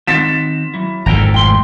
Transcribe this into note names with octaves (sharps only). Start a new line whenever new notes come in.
D#3 C4 F#5 A6 B6 E7
F#3 E4
G#1 F2 G#2 A4 G5 A#5
B1 A2 G5 C6